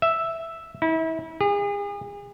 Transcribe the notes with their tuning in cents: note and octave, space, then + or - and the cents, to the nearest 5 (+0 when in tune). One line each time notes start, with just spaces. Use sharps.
E5 +0
E4 -35
G#4 -40